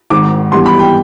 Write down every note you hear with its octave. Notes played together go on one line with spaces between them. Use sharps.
G#1 G#2 D#3 D6
G2 E3 G3 B3 C6
B5
G5